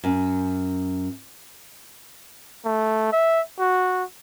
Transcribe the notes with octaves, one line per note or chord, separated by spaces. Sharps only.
F#2
A3
E5
F#4